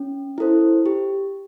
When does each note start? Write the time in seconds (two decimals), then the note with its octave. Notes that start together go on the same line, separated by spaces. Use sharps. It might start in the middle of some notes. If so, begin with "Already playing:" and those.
Already playing: C#4
0.38 E4 A4 C5
0.86 G4